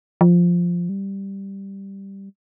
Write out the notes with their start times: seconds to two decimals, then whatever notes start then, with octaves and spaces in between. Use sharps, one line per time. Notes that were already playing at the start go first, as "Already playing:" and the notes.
0.21 F3
0.89 G3